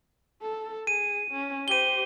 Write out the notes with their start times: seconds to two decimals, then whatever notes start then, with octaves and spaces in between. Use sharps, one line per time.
0.42 A4
0.87 G#4 D#7
1.31 C#4
1.68 G4 C5 D#7 G7